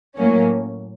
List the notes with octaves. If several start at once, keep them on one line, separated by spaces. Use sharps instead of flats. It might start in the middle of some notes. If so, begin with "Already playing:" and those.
A2 F#3 A#3 C#4